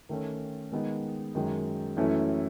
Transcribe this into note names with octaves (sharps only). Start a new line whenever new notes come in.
D#3 A3 C#4
D#3 G#3 B3 D#4
F#2 D#3 G#3
F#2 E3 A3 C#4 E4